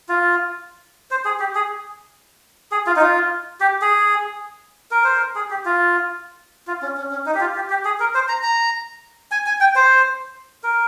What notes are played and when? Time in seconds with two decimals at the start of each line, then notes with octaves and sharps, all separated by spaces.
0.09 F4
1.11 C5
1.25 G#4
1.40 G4
1.55 G#4
2.72 G#4
2.87 F4
2.96 D#4
3.01 F4
3.60 G4
3.81 G#4
4.91 A#4
5.04 C5
5.16 A#4
5.35 G#4
5.50 G4
5.65 F4
6.67 F4
6.82 C#4
6.97 C#4
7.11 C#4
7.26 D#4
7.34 G4
7.40 F4
7.55 G4
7.70 G4
7.85 G#4
8.00 A#4
8.15 C5
8.28 A#5
8.43 A#5
9.31 G#5
9.46 G#5
9.60 G5
9.76 C5
10.63 A#4